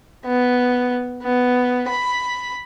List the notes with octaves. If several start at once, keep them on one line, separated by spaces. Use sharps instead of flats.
B3
B3
B5